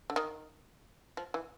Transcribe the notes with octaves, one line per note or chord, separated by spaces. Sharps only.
D3
D#3
F3
E3